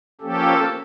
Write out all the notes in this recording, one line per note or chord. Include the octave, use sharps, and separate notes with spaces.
F3 A#3 C#4 G4 A4